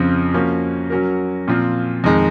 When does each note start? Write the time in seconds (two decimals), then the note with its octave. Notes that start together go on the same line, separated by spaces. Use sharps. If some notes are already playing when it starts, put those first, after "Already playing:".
Already playing: F2 C#3 F3 C4 F4
0.34 F3 A#3 C#4 F#4
0.90 F#3 C#4 F#4 A#4
1.48 A#2 F3 C4 F4
2.04 F2 D#3 G#3